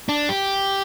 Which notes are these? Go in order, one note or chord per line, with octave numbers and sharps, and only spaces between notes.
D4
G4